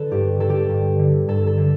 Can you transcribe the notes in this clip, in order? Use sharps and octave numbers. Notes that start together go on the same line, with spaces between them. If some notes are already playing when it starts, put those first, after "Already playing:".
Already playing: D3 A4 B4
G2 G4
D3 A4
G4
G2
D3
G2 A4
A4
D3